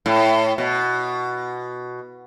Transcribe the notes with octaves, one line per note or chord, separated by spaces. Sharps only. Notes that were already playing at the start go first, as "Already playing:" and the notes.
A2
B2